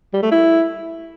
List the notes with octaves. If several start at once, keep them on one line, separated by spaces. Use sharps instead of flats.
G3
A3
E4